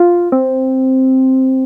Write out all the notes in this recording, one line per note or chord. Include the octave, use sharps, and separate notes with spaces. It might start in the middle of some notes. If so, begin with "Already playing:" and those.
Already playing: F4
C4